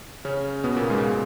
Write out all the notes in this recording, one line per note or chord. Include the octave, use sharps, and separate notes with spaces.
C#3 C#4
B2 B3
A#2 A#3
G#2 G#3